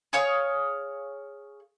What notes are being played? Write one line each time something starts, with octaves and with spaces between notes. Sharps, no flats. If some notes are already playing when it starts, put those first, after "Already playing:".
G#4 C#5 F5 C#6